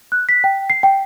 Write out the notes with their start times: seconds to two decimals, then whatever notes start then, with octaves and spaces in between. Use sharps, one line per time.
0.12 F#6
0.29 B6
0.44 G5
0.70 C7
0.83 G5